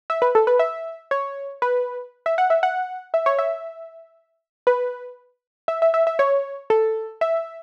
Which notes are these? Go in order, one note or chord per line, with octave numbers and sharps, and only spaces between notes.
E5
B4
A4
B4
E5
C#5
B4
E5
F#5
E5
F#5
E5
C#5
E5
B4
E5
E5
E5
E5
C#5
A4
E5